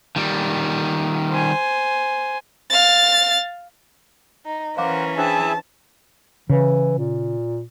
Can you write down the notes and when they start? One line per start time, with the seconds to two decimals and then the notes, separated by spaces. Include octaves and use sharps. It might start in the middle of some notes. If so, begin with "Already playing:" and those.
0.16 D#3 G3
1.30 C5 G#5
2.70 F5 A6
4.46 D#4
4.77 E3 C#4 A#4 C5 F5 F#5 D6
5.17 D4 E4 G#4 C5 E5 G5 A5
6.50 C#3 E3
6.98 A#2